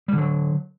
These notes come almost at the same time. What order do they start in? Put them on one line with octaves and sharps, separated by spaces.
G3 D3 F#3